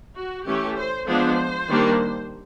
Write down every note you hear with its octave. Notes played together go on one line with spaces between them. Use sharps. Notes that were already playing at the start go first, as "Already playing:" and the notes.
F#4
E3 A3 C#4 G4
C5
F3 G#3 B3 D4 C5
D#3 G3 A#3 D4